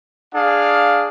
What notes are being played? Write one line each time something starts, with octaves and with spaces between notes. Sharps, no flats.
D4 G#4 F5